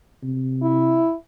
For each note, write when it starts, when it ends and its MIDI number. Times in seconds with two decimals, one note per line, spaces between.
0.23 1.05 48
0.62 1.14 64